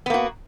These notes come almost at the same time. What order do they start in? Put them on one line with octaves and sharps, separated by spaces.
B3 A#3 F#4